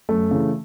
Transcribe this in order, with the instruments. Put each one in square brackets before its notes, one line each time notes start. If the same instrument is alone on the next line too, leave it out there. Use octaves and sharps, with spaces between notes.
[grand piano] F#2 A3
C#3 E3